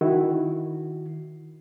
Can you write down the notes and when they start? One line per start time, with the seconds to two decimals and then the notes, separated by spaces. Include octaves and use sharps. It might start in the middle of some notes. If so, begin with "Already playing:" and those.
0.01 D#3 E4 F#4